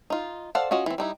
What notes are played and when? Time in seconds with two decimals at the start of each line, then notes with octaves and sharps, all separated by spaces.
0.10 D#4 F4
0.55 A4 C5 D5 F5 F#5
0.71 C#4 F4 F#4 D#5
0.86 E3 C4
0.98 G3 D#4 E4